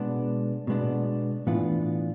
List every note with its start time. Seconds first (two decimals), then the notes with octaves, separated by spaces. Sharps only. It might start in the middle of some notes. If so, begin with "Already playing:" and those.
Already playing: B2 G#3 B3 D4
0.67 B2 G#3 B3 D4
1.47 A2 E3 B3 D4 F4